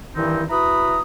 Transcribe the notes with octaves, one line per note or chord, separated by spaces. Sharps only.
G2 D#3 E3 C4 D#4 E4
E4 F#4 B4 A#5 B5 D#6